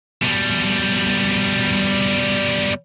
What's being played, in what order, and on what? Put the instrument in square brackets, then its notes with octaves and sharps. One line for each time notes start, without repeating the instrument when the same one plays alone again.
[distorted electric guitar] B2 G3